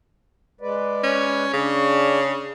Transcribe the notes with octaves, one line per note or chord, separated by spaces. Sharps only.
G#3 B4 D5
C#4
C#3 C#4 D4